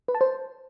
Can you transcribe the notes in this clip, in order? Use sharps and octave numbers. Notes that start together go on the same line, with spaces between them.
B4
A5
C5